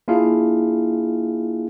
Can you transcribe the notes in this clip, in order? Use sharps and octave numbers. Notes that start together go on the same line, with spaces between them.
A#3 D4 E4 F4 G#4 F5